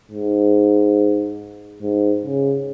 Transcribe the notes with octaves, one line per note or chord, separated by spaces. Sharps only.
G#2
G#2
C#3